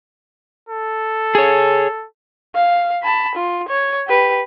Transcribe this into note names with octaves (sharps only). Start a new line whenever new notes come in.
A4
G#4 C#5
F5
A5 B5
F4
C#5
G4 B4